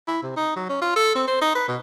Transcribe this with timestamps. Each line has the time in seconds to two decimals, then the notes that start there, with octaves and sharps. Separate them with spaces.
0.08 E4
0.23 C3
0.37 D#4
0.56 F#3
0.70 C#4
0.82 F4
0.96 A4
1.15 C4
1.28 C5
1.41 D#4
1.55 B4
1.68 B2